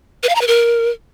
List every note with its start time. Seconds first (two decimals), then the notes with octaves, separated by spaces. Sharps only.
0.23 B4
0.29 F5
0.35 A#5
0.41 B4
0.47 A#4